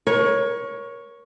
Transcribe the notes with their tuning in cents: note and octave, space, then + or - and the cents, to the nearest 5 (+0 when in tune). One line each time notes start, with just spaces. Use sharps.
A#4 +30 C#5 +0